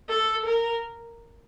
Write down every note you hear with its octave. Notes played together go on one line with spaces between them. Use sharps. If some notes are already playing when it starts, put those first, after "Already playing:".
A4
A#4